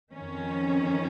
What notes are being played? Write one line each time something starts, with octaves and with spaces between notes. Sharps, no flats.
F2 D#3 C#4